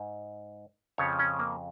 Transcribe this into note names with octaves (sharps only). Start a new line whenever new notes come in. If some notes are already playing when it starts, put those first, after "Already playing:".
Already playing: G#2
F2 C#3 F3 C#5
C#4
A#3